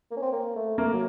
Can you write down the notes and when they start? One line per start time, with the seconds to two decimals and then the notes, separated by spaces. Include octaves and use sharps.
0.11 A#3
0.17 C#4
0.22 C4
0.33 A#3
0.56 A3
0.78 A3 A#3
0.93 F#3